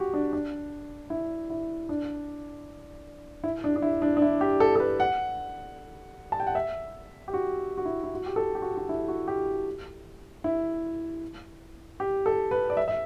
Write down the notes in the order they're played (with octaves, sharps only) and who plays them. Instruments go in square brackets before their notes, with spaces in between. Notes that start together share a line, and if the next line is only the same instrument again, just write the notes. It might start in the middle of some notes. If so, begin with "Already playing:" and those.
Already playing: [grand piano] F#4 G4
D4
D4
E4
E4
D4
E4
D4
D4
E4
D4
D4
E4
G4
A4
A4
B4
F#5
A5
G5
F#5
E5
G4
F#4
F#4
E4
E4
F#4
G4
A4
G4
F#4
F#4
E4
F#4
G4
E4
G4
A4
B4
D5
E5
E5